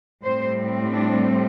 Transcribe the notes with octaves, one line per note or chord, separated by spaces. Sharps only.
A2 G3 C4 C5
D4